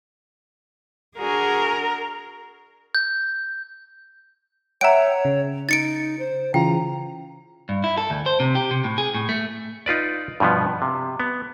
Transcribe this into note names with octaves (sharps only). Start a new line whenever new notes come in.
D4 F#4 G#4 A#4
G6
C#5 E5 F#5 G5 A#5 D7
C#3
D#4 A6 C#7 D7
C5
C#3 E3 F4 G5 A#5
G2
E4
A4
D2
C5
C3
G4
C3
A2
G#4
A2
A3
D#4 F4 B4 D5
G2 B2 F3 B3
C3
B3